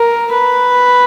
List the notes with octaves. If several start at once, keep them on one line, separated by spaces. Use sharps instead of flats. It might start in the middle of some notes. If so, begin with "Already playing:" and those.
Already playing: A#4
B4